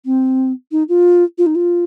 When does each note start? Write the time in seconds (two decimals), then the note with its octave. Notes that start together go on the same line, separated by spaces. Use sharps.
0.05 C4
0.71 D#4
0.89 F4
1.38 F4
1.46 D#4
1.55 F4